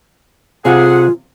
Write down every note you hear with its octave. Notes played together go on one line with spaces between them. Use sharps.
C3 F4 G#4 F5 F#5